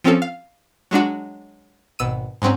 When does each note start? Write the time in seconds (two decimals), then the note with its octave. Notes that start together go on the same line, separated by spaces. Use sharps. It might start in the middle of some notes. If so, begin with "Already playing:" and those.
0.04 F3 C4 C#4 F4 A4
0.22 F5
0.91 F#3 G#3 D4 F#4
1.99 G#1 B2 E6 D#7
2.42 G#2 F#3 C4 C#4